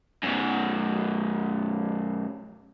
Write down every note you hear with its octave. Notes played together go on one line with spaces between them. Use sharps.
F#2 B2